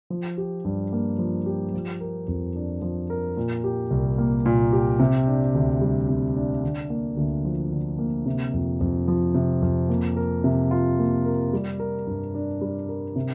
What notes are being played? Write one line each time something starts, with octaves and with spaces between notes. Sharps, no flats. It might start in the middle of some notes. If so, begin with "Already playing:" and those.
F3
G4
G2
A#3
F3
G4
F3
A#4
F2
D4
F3
A#4
A#2
G4
C2
A#3
A#2
G4
C3
D4
D2
G3
C3
D4
D3
A#3
D2
F3
D3
A#3
C3
F2
F2
F3
C3
F2
A#3
A#4
C3
F4
A#3
A#4
G3
A#4
G2
D4
G3
A#4
C3